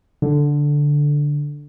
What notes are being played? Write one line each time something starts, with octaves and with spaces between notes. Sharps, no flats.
D3